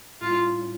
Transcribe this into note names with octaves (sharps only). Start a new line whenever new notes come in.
A2 G3 C#4 E4 F4